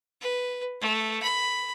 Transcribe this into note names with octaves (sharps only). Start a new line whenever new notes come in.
B4
A3
B5